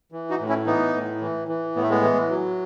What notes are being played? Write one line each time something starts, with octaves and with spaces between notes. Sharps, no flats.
E3
D#4 F#4
A2
C#4 E4
E3 B3 D#4
A2
E3
E3
A2 B3
A3
G#3 B3
E3
F#3